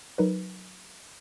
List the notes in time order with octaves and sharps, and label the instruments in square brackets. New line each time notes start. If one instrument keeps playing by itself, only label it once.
[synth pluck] F#3 D#4 A#4 B4